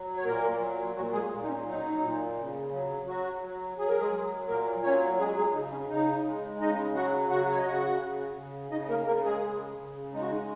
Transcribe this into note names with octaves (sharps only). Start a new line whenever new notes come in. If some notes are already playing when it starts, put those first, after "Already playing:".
Already playing: F#3
C#5
A#2 A#3 A#4
F#3
A#2 F#3 F#4
G#3 G#4
A#2
D#4
C#4
F#3 D#4
A#2
C#3
F#3
F#3 F#4
F#3
F#3 G#4
A#4
G#3 G#4
F#3
A#2 A#3 A#4
F#3 C#4 C#5
G#3 G#4
G#3 G#4
C#3 D#4
C#4
C#3 D#4
G#3
C#3 D#4 D#5
F#3 F#4 F#5
C#3 F#4 F#5
C#5
D#5
C#3 F#4 F#5
C#3
C#3
C#3 D#4 D#5
A#3 A#4
C#3 A#3 A#4
G#3 G#4
C#3
C#3
G#3 D#4
F#4
D#4